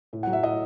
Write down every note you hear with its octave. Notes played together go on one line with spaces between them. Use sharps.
A2
F#3 F#5
E5
A2 D#5